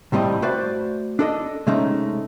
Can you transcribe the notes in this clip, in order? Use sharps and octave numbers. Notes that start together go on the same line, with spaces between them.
C2 A2 G3 C4 D#5
A3 F#4 B4 C5 D5
D4 A4 D#5
C3 G#3 A3 C#4 D#4